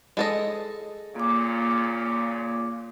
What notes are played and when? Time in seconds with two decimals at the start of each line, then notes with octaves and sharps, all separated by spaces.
0.17 G#3 A4 D#5
1.16 A#2 C#3 A#3 F4 D6